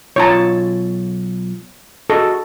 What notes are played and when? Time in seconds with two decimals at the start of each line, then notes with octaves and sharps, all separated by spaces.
0.16 B1 F4 C#5 A5 A#5
2.10 F#4 G#4 A4 D#5